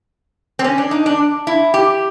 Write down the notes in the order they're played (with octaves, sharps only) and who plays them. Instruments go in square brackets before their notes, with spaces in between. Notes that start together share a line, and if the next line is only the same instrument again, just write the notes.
[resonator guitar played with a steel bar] C4
C#4
D4
D#4
D4
E4
G4